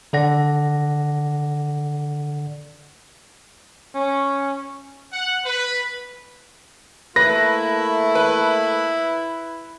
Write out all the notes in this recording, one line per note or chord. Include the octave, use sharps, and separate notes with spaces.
D3 A4 D5 F#5 A#6
C#4
F#5
B4
A3 A#3 E4 B4 A#6
B4